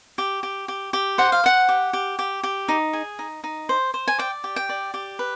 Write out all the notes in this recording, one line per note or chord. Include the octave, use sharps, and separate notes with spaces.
G4
G4
G4
G4
C5 F#5
F5
C5 F#5
G4
G4
G4
G4
D#4
G#4
D#4
D#4
C5
C5
G#5
D5 G5
G4
G5
D5
G4
B4